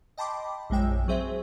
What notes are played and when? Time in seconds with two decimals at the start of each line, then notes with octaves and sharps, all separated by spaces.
0.18 D#5 G5 A5 B5 C6 D6
0.70 A#1 F#2 G#3 G5 E6
1.08 F#3 C4 G#4 C5 E5